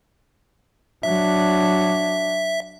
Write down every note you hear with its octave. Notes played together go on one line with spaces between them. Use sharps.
F#3 D4 E5